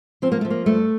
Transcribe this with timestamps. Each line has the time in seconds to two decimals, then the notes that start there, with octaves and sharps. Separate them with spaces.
0.22 F3 C4
0.32 A#3
0.41 F3 A3
0.50 A#3
0.66 G2 A3